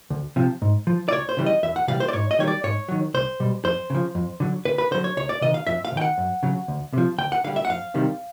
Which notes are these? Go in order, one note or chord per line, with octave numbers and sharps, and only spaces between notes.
D2
C3 F3
G#2
F3
D5
C#2 C#5
C5
C#3 E3 G3
D#5
E2 E5
F#5
C3 E3 G3 F5
C5
D5
G#2 C#5
D#5
D#3 G3 C#5
D5
G#2 C#5
D#3 F#3
C2 C5
B2 G3
F2 C5
C#3 F3
F2
D3 F#3
D2 B4
B4
D3 F#3 C5
C#5
C#2 C#5
D5
C3 D#3 D#5
F5
F2 E5
F5
C3
D#3 G5
F#5
F#2
C#3 F#3
D2
C3 F3
D2 G5
F#5
D3 G3 F5
E5
F#5
F2 F5
C3 D#3 G3